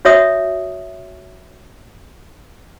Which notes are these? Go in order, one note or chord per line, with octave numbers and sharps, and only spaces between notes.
F#4 C#5 E5 D#6